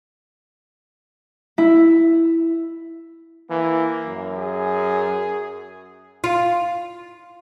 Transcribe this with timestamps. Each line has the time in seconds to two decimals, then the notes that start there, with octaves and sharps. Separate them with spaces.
1.58 E4
3.50 E3 A#3
4.06 F#2
4.37 G#4
6.24 F4